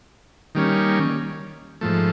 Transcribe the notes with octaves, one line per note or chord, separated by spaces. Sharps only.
D#3 G3 A#3 C#4
G#2 F3 A3